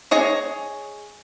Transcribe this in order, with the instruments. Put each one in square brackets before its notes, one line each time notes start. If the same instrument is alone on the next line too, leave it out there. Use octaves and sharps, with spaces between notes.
[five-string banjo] G#4 C#5 D#5 G#5